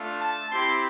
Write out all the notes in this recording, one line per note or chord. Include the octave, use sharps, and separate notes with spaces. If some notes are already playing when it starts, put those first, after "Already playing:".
Already playing: A3 D4 F4
A5
C4 E4 G4 C6